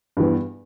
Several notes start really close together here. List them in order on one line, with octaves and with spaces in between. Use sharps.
G2 E3 B3